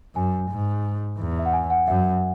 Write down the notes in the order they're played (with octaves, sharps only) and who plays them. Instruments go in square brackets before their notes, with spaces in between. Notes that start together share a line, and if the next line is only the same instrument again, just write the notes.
[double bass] F#2 [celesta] G#5
[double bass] G#2
E2
[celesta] E5
F#5
G#5
F#5
[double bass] F#2 [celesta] E5